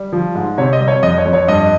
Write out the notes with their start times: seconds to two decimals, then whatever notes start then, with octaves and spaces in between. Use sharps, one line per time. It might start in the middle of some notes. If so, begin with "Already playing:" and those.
Already playing: G3
0.13 F3
0.35 G#2
0.58 C3 C#5
0.73 D#5
0.80 G3
0.88 C#5
1.03 F2 D#5
1.18 C#5
1.25 F2
1.33 C#5
1.48 G2 D#5